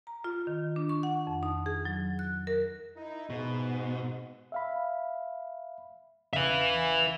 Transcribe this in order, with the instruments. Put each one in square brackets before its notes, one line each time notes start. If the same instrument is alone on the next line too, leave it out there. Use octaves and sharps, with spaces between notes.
[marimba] A#5
F4
D#3
D4
C#6
F#5
F2
D#4
G#4
F#3
F#6
A#4
[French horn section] D#4 E4
[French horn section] G#2 [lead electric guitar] B2
[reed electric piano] E5 F5 B5
[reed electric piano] E2 C#3 F5 [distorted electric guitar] B4 E5